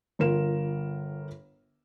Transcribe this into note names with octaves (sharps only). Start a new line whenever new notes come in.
G1 F4 A#4 E7